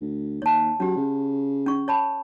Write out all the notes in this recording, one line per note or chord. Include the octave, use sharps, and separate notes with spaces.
D2
D#2 C#5 A5
F#3 C#4 G4
C#3
C#4 C#6
C#5 A5 B5